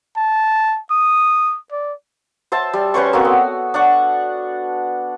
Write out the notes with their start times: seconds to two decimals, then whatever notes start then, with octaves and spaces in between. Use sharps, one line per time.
0.17 A5
0.91 D#6
1.72 D5
2.52 C5 E5 A5 E6
2.73 G3
2.94 C#4 B4 C5 C#6
3.13 A#3 C4 F#4 A4
3.25 B3
3.74 D4 F#5 C#6